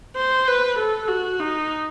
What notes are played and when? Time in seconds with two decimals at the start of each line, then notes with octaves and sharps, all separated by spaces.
0.16 C5
0.48 B4
0.78 A4
1.08 F#4
1.40 D#4